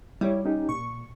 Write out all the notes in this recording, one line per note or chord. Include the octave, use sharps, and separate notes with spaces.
G3 E4 G4 C#5
C#4 D#4 G4
A#2 C#6